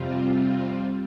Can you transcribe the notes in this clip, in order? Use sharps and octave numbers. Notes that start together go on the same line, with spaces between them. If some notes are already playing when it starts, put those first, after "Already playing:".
Already playing: F2 C3 G3 C4 F4